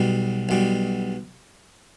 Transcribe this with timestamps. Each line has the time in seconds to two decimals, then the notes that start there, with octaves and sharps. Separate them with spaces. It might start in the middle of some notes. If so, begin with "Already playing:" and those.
Already playing: B1 B2 G3
0.49 B1 B2 G3